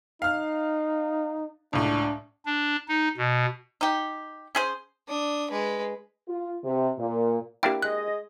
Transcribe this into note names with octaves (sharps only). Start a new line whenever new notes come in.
D#4 F5 F6
C#2 A2 D4
D4
D#4
B2
D#4 G4
C#4 G#4 C5
D4 D#6
G#3 B4
F4
C3
A#2
A#3 D4 E4 G4 G5
G#3 G#4 D#5 F#6